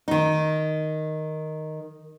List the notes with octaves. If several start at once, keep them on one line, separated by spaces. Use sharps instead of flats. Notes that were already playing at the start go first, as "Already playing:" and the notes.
D#3 D#4